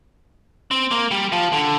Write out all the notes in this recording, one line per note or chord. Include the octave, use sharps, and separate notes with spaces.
C4
A#3
G3
F3
D3